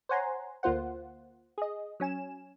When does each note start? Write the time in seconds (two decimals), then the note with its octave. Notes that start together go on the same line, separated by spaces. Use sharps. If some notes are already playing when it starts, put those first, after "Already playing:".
0.09 C5 C#5 F#5 G#5 A#5 C6
0.63 D2 A#3 F4 C5 F#5
1.58 G#4 D#5
2.00 F#3 C#4 G#5 E7